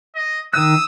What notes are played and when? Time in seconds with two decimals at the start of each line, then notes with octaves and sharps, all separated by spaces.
0.15 D#5
0.54 D#3 D#6 E6 F#6